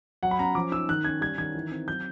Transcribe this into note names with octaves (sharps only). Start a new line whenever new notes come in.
F#3 F#5
B5
C#4 A#5
F3 D6
D#4 E6
D#3 F#6
C#4 G#6
G3 G#6
D#3 G#6
E3
C4
F#3 G6